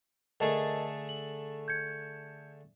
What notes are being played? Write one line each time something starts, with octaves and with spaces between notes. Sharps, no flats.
D3 A3 G#4 A#4 D#5 A5
F#7
G6 G#6 C#7